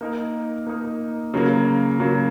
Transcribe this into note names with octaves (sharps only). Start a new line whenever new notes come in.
A#3 D#4 A#4
A#3 D#4 A#4
C#3 F#3 A#3
C#3 F#3 A#3